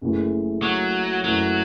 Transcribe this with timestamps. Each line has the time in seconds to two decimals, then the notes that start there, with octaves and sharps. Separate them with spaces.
0.01 F#1 F#2 C#3 E3 A3
0.62 F#3
1.24 F#2 E3 F#3 A3